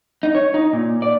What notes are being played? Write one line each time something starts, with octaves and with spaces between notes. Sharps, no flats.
D#4
C#5
D#4
A#2
D5